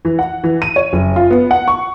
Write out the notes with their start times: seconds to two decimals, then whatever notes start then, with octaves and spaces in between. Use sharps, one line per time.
0.05 E3
0.19 F#5
0.44 E3
0.62 D#7
0.76 C#5
0.93 F#1
1.16 F4
1.31 B3
1.51 F#5
1.68 C#6